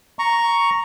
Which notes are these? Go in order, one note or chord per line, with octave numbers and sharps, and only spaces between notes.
A#5 C#6